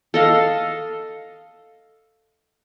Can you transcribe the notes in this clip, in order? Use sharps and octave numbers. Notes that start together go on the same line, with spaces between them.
A4 D#5 F5